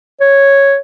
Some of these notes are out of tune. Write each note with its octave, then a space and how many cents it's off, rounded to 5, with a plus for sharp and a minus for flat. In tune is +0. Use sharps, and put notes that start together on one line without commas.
C#5 -5